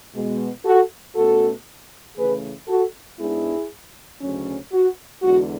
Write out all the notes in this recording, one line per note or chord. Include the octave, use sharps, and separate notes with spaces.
B2 G#3 B3
F#4 A4
B2 A3 C#4 F#4 A4
C#3 E3 A3 G#4 B4
F#4 A4
G#2 G#3 B3 D4 E4 G#4
D2 C#3 F#3 C#4
F#4
E2 D3 G#3 F#4